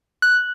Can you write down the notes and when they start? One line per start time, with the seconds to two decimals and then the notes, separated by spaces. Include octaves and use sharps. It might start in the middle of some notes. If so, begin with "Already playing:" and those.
0.22 F#6